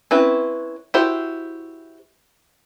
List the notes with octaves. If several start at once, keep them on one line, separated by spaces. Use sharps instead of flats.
C4 C#4 E4 B4
E4 F#4 G4 C5